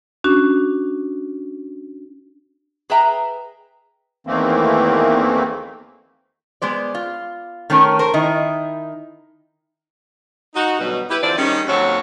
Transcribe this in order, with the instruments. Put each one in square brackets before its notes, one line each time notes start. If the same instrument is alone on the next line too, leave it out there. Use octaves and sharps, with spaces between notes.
[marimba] C#4 D4 F#4
[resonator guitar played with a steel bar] G#4 B4 D#5 E5 G5 A#5
[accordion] E2 D#3 E3 A3 A#3 C4
[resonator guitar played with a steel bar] G#3 B3 C5 D5
F4
D#3 A3 C#4 A#4
A#4 C5
D#3 D#4 E4
[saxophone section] D#4 F#4
D2 B2 F#3 G3 F#4 B4
E4 G4 B4
D3 E3 F3 C4 D5
D#3 G3 G#3 C#4
D#2 F#3 C4 A4 C#5